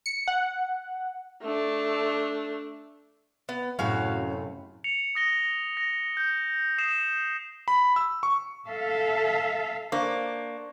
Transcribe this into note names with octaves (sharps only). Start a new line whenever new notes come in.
C#7
F#5
A3 D4
B3
F#2 A2 C3 C#4 F#4 F5
C#7 F7
D#6 A#6 G7
A#6
G6
D#6 C7 E7
B5
E6
C#6
A4 E5 F5
A#3 D4 C5 C#6